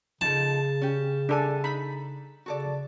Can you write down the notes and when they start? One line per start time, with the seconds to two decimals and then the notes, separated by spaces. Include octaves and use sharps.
0.21 C#3 F3 D#4 A4 A5
0.82 C#4 G4
1.29 D4 G4 A4 G#5
1.64 D#4 B5
2.46 C#3 F#4 A4 D5